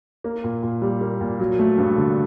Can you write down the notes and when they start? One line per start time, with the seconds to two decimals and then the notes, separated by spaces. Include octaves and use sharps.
0.24 A#3
0.44 A#2
0.63 A#2
0.82 G3
1.01 A#3
1.21 A#2
1.39 F#3
1.59 A3
1.78 G2
1.98 D3